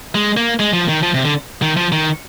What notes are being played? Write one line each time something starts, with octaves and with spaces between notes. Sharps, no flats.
G#3
A#3
G#3
F3
D#3
F3
C3
D3
D#3
F3
D#3